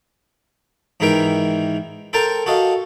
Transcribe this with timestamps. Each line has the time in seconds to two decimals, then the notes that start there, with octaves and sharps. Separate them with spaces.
1.00 G#2 D#3 E3 A#4 E5 G5
2.13 A4 A#4 C5 G5 A5 A#5
2.46 F#4 G4 A4 D#5 F5